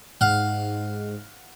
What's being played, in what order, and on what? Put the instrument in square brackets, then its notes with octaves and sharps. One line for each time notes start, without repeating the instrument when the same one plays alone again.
[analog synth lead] G#2 [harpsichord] F5 F#5